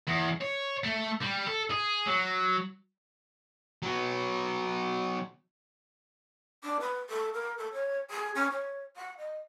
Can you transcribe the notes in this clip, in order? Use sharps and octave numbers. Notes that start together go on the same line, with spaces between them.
E2
C#5
A3
G3
A4
G#4
F#3
F#3 B3
D4
B4
A4
A#4
A4
C#5
G#4
C#4
C#5
F#5
D#5